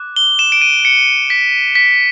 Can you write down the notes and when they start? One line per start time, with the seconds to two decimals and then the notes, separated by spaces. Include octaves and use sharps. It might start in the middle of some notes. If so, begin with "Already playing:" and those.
Already playing: D6 F#6
0.16 G7
0.39 E7
0.52 D7
0.62 D#7
0.85 C#7
1.30 B6
1.75 B6